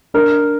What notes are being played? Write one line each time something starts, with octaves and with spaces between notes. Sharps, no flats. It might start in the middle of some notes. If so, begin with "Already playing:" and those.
D4 A#4